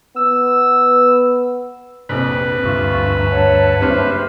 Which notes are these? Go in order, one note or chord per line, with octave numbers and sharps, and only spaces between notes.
B3 E6
A#1 F2 C3 B4
D2 G2 F4 E5 C#6
G#5 A#5
C#5 F#5 A5
F#1 G2 G4 C5 E5 F6